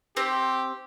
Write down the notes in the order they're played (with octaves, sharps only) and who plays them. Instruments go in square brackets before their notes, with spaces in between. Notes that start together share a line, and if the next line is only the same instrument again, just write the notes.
[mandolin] C4 [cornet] G4